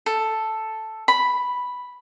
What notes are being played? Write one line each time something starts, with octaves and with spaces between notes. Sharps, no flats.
A4
B5